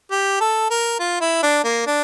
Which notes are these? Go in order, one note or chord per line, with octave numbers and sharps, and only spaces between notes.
G4
A4
A#4
F4
E4
D4
A#3
D4